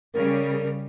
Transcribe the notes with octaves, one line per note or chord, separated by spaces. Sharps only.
C#3 G3 A#4